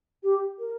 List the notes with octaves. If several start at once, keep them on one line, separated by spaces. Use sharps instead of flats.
G4
A#4